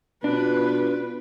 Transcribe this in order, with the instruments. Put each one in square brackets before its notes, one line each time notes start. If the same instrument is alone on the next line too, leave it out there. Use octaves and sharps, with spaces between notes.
[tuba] B2 [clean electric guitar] D4 [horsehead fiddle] F4 B4